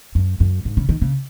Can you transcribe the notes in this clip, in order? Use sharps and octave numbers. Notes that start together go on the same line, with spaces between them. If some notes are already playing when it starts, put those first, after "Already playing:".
F#2
F#2
G#2
C#3
D#3
C#3